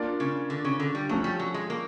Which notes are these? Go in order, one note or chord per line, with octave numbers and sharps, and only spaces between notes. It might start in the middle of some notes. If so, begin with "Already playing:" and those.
Already playing: A#3 D4 F4 A#4 D5
C#3
D3
C#3
D3
G3
F3 F#3 A3 C#4
G3
F#3
G#3
A#3